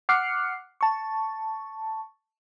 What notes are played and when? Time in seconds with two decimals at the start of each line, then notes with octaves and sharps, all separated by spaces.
0.09 F#5 D6 F6 F#6 C7 C#7
0.81 A5 C#6